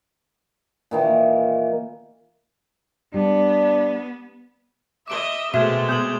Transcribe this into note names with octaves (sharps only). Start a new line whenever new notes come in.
A#2 D#3 E3
G3 B3 D4
D#5 E5 D6 D7 G7
B2 G#3 A3 C4 E5 F6 G#6 E7
B3 D#6 E7 F#7